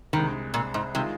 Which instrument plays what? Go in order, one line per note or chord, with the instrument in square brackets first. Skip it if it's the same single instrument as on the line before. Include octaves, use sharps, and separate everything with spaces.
[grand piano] C2 C3 G#3 [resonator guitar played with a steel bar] D#3
[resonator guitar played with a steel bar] A#2
G#2
[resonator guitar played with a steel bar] C3 [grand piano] D#3 G#3 F4